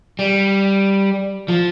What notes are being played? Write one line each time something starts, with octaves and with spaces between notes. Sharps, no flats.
G3
F3